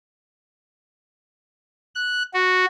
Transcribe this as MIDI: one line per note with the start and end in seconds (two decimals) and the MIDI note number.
1.95 2.23 90
2.34 2.66 66